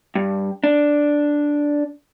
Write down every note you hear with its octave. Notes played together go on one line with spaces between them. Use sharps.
G2
D4